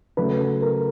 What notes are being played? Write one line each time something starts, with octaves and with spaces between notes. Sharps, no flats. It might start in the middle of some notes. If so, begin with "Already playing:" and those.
C#3 F#3 A3 B4
A#4